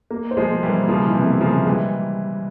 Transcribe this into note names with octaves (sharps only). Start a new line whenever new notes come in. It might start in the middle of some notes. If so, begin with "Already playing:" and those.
A#3
C5
F3 G#3
A#3
E3 G3
A#3
C#3 F3 A#3
E4
C3 E3
A#3
C#3 F3
A#3
E3 G3 G#3